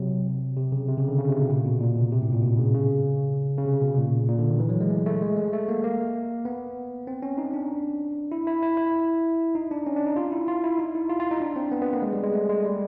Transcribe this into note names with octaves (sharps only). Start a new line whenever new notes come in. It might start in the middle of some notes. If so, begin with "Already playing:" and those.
Already playing: C3 F#3
C3
C#3
C3
C#3
D3
C#3
C3
B2
A#2
B2
A#2
C3
C3
A2
A#2
B2
C#3
C#3
C#3
C3
B2
A#2
A#2
D3
D#3
E3
F#3
G#3
A3
A3
G#3
A3
A3
A#3
A#3
B3
C4
C#4
D#4
D4
E4
E4
E4
E4
D#4
D4
C#4
D4
D#4
F4
E4
F4
E4
D#4
E4
F4
F4
D#4
D4
C4
B3
B3
A#3
G#3
G3
G#3
A3
G#3
G3